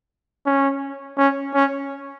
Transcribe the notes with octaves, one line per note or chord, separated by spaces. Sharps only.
C#4
C#4
C#4